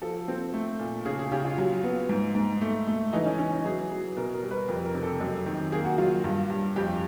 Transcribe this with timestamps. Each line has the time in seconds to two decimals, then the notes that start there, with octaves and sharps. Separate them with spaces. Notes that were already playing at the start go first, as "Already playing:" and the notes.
0.02 F3 A4
0.28 C4
0.54 A3
0.79 A#2
1.05 C#3 G#4
1.19 G#4
1.32 C#3 G4
1.44 F4
1.58 F#3
1.83 B3
2.09 G#2
2.35 G#2
2.61 A3
2.87 A3
3.13 E3 D#4
3.26 C#4
3.39 E3 C#4
3.52 D#4
3.65 F#3 G#4
3.91 F#3
4.16 B2 A#4
4.34 A#4
4.43 G3
4.51 B4
4.69 F2 A#4
4.85 A#4
4.94 C3
5.03 A4
5.20 F#2
5.46 D#3
5.72 A#3 G#4
5.85 F#4
5.98 F#3 F4
6.24 G2
6.50 G2
6.76 F2 G4